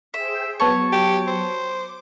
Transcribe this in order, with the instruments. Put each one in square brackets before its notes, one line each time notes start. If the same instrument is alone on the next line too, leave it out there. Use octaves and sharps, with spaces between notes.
[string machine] G#4 C5 G5 [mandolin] E5
[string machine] F#3 [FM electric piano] B3 A5 C#7 [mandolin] C#5
[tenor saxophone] G4
C5
[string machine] D6